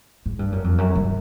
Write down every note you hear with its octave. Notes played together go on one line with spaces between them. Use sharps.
G#2
G2
F#2
F2
F#2
G2